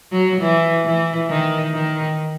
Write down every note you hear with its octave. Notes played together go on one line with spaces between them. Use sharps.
F#3
E3
E3
D#3
D#3